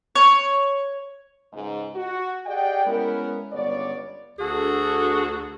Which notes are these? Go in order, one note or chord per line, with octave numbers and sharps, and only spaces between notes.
C#5
C#2 G#2 G#3
F#4
G4 G#4 D5 D#5 F#5 G5
G#3 B3 C#4 E4 A#4
G1 C#2 B3 C#5 D5
D2 D4 F#4 G#4 A4